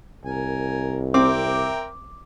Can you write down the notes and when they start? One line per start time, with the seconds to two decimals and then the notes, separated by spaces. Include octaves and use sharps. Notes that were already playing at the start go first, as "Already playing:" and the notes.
0.25 C2 A#4 G#5
1.14 C4 A#4 E5 G5 D6